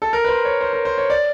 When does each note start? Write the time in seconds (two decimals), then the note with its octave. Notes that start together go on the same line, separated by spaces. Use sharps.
0.02 A4
0.13 A#4
0.24 B4
0.29 C5
0.45 C#5
0.61 C5
0.73 A#4
0.85 C5
0.98 C#5
1.10 D5